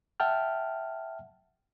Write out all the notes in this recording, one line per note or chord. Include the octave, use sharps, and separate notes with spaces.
E5 F#5 G5 A5 F6